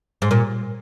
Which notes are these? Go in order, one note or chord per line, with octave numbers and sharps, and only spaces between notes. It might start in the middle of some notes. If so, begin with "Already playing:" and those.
G#2
A#2